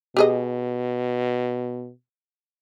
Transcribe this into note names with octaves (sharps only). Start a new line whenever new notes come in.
B2 G4 G#4 D#5